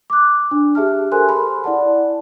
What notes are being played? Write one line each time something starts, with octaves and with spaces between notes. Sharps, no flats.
D6 F#6
D4
G4 G#4 E5 A5 F6
A4 A#4 C5 G#5 C6 F#6
B5 C6
E4 D5 F#5 A5